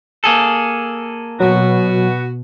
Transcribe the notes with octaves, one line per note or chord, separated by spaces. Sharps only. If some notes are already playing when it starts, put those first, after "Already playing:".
A#3 G#4 A4
B2 F#3 B3 F#4